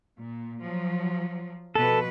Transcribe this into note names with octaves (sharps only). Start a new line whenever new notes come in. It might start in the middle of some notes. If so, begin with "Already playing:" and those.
A#2
F3 F#3
B2 F3 A4 B4